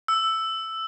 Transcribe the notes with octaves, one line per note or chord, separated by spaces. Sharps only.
E6